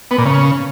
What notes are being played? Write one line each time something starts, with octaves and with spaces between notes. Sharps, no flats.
B3
A#2
C#3